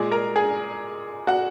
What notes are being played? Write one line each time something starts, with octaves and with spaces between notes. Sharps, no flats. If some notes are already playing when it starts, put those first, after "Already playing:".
Already playing: A#2 G#3 G#4 G#5
A#4 A#5
G#4 G#5
F#4 F#5